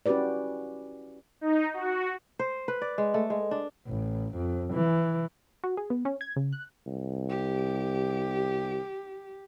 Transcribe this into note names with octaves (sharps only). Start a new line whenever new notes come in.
C#4 E4 F#4 G4 B4 D5
D#4
F#4
C5
B4
D5
G#3
A3
G#3
D4
A1
F2
E3
F#4
G#4
B3
C#4
G#6
C#3
F#6
C2
G4